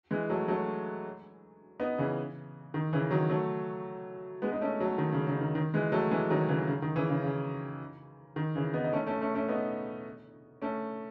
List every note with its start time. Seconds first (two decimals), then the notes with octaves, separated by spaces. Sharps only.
0.11 E3 G#3
0.30 F#3 A3
0.48 F#3 A3
1.80 B3 D#4
1.98 C#3 E3
2.74 D#3
2.93 C#3 E3
3.11 D#3 F#3
3.29 F#3 A3
4.42 G#3 B3
4.52 D#4
4.61 A3 C#4
4.80 F#3 A3
4.98 D#3
5.12 C#3
5.27 C#3
5.41 D#3
5.55 D#3
5.74 E3 G#3
5.92 F#3 A3
6.11 E3 G#3
6.30 D#3 F#3
6.49 C#3 E3
6.67 C#3
6.82 D#3
6.96 C#3 E3
7.10 C#3
7.24 C#3
8.36 D#3
8.55 C#3 E3
8.74 B3 D#4
8.84 D#4
8.93 A3 C#4
9.06 A3 C#4
9.21 A3 C#4
9.35 A3 C#4
9.48 B3 D#4
10.62 A3 C#4